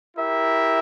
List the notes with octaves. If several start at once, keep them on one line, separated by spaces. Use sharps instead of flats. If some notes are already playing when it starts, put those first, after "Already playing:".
E4 G4 A#4 E5